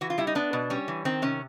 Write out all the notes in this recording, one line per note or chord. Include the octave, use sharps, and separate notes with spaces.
E3 F#4
F4
G3 E4
D#4
B3 D4
B2
G3 C#4
E3
D#3 C4
C3 C#4